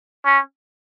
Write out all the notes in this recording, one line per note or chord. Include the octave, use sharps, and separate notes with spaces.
C#4